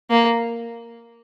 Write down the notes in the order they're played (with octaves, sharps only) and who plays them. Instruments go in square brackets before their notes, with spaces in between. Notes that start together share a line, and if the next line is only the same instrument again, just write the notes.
[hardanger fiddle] A#3